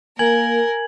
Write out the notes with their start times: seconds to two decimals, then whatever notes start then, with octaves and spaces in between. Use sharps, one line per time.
0.19 A#3 A#4 G#5 G#6 F#7